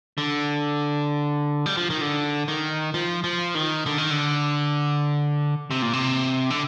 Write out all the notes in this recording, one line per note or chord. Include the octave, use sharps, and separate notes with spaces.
D3
G3
F3
D#3
D3
D#3
F3
F3
D#3
D3
D#3
D3
C3
A#2
C3
D3